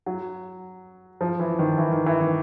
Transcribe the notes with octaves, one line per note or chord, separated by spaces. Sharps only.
F#3
F3
E3
D#3
E3
D#3
E3
D#3